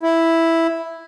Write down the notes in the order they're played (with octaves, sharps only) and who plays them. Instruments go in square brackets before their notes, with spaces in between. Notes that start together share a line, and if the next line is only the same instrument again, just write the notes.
[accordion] E4